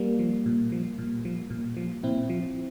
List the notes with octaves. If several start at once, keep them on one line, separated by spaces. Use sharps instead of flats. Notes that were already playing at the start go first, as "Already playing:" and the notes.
Already playing: G3 A#3
F3
A#2
F3
A#2
F3
A#2
F3
A#2 C4 E4
F3